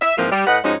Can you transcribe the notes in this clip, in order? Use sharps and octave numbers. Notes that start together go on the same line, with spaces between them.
E5
G#2 E3 F3 A#3 C4 F4
G3
A2 B4 D#5 F#5
G#2 F3 G#3 C#4 D#4 F#4